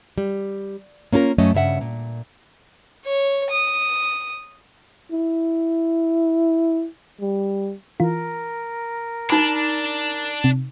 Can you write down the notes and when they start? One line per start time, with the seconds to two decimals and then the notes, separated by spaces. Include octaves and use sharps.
0.18 G3
1.13 A#3 C#4 F4 A4 A#4
1.38 F#2 F#3 A3 C#4 D#5
1.55 G2 C#3 E5 F#5
1.81 A#2
3.05 C#5
3.50 D#6
5.12 E4
7.21 G3
8.00 E3 F4 A#4
9.30 D4 D#4 B5
10.44 C3